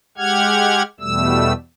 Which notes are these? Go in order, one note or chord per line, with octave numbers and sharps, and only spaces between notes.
G#3 G4 F#5 F6 G#6
E2 B2 G3 A3 E6